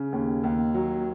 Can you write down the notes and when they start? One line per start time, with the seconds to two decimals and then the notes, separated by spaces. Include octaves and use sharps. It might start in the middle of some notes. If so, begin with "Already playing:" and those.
Already playing: C#3
0.12 D#2
0.43 D#2
0.74 F#3